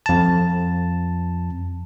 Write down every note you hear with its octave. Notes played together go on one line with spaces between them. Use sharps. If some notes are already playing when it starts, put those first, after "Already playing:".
F2 A5